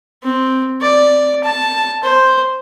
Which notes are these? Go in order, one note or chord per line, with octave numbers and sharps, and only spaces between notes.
C4
D5
A5
C5